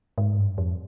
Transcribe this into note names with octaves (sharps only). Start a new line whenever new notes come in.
G#2
G2
F2